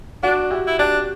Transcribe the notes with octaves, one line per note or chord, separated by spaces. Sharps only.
D4 F#4
E4 G4
E4
D4 G4